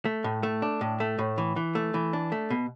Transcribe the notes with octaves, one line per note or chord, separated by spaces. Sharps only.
A3
A2
A3
D4
A2
A3
A2
E3
E3
A3
E3
D4
A3
B2